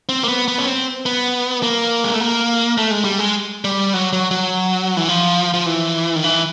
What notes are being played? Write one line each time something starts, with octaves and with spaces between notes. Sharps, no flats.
C4
A#3
B3
B3
C#4
C4
B3
A#3
G#3
A3
A#3
A3
G#3
G3
G#3
G3
F#3
F#3
F#3
E3
F3
F3
E3
D#3
E3